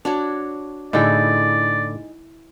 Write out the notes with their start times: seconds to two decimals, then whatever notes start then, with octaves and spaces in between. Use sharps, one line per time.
0.05 D4 F#4 C#5
0.93 A2 D3 D#4 E4 G#4 D5 E5